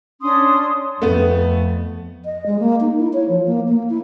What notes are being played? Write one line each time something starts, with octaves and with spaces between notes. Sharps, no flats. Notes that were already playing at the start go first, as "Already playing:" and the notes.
C#4 D4 C6 D#6
F2 A3 B3
D#5
G#3
A#3
D#4
E4
C#5
F3
A#3
A#3
E4